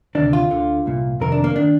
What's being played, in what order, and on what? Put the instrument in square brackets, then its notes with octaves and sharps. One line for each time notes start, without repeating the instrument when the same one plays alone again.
[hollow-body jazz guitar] D2 C3 D#3 D4
F4
D2 D3
C2 A#2
F2 C3 D#3 A#4
D4
A#3
D#3 D4